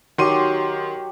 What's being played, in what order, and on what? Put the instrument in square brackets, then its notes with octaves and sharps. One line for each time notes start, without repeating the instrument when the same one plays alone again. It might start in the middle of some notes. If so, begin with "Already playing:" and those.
[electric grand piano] D#3 C6 D#7 [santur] F#3 G4